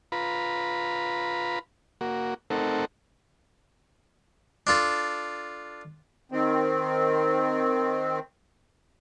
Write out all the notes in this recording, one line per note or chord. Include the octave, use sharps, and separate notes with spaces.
F4 B4 A#5 B5
A#3 F#4
A3 C4 D#4 A4 A#4 F#5
D4 F4 A4
D#3 C4